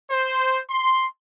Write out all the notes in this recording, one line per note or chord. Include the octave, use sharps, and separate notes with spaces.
C5
C6